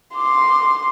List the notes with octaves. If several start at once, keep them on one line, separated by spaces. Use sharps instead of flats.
C6 D6